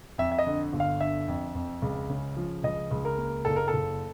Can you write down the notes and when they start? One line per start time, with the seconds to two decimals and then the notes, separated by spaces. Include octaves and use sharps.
0.18 F2 E5
0.32 E5
0.39 D#5
0.47 D3
0.73 G1
0.80 F5
1.00 D3 E5
1.28 F2
1.55 F2
1.82 C#2
2.10 C#3
2.37 F3
2.63 C#2 D#5
2.91 C#2
3.05 A#4
3.18 A#3
3.45 F#1 A4
3.56 A#4
3.68 A4
3.73 F#1